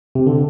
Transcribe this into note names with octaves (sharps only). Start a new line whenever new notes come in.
C3
D3